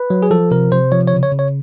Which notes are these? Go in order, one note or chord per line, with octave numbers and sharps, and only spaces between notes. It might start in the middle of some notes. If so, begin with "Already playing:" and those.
Already playing: B4
F#3
G#4
F3 A4
C3 A#4
C3 C5
F3 C#5
C#5
C#3
C#5
C#3
C#5